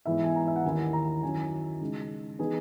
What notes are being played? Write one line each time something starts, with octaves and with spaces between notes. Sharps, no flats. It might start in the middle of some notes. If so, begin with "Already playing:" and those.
G#2 E3 B3 E4 E5
G#5
A#5
E5
F#5
D#2 D#3 A#3 E4 G#5
A#5
F#2 D#3 F#3 C#4 E4 G#5
C#3 G#3 D#4
E3 B3 D#4 G#4